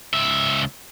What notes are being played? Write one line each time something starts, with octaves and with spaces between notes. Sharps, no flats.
C#2 E5